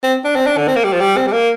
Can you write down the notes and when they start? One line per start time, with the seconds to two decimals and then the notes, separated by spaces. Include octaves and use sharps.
0.03 C4
0.25 D4
0.36 C4
0.46 D4
0.57 D3
0.68 C4
0.76 A#3
0.84 G3
0.92 F3
1.00 G3
1.17 C4
1.27 G3
1.33 A#3